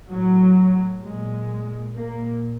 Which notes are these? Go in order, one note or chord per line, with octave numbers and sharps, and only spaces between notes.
A2 F#3
A#2 G#3
A#2 A#3